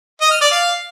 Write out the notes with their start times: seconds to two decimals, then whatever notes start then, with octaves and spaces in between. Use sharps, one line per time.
0.21 D#5
0.31 F6
0.41 D5
0.51 F5